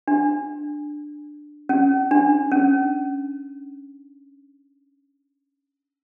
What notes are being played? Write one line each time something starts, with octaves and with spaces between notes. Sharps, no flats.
D4
C#4
D4
C#4